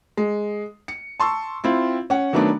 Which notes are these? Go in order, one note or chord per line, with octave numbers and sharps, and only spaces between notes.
G#3
C#7
A5 C6 C#6 E6
C4 E4 F4
C#4 F#5
D#3 F#3 A3 B3 D4